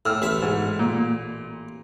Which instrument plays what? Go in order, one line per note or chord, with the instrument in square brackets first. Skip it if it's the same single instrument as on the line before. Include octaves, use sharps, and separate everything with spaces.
[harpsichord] A2 [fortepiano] E6 F6
[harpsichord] A1 E5
[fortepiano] G#2
A#2